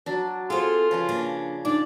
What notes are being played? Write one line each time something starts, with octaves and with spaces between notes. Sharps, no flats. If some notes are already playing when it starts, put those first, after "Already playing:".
F#3 D4
C4 F4 G#4 A4
C#3 F3 B4
A#3 D4
D4 D#4 D5